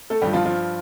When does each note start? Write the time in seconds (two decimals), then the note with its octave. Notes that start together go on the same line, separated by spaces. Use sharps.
0.10 A3 A4
0.22 G2 F3 G3 G4
0.34 F3 F4
0.45 F3 F4